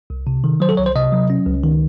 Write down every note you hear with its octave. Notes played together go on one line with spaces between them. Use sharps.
C2
C3
D#3
F#3 C5
A4
C2 C#5
C5
C3 D#5
F#3
C#4
C#2
D#3